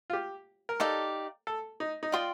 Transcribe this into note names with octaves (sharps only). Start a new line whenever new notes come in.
F4
G4
A#4
D#4 G4 A4 D5 F5
A4
D#4
D#4
F4 D5 G5 C6 D#6